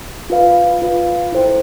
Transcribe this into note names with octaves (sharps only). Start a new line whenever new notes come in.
F4 B4 F5
F4 B4 F5
E4 A4 C5 G5